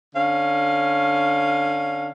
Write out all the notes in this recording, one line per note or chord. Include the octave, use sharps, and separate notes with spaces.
D3 C#4 F5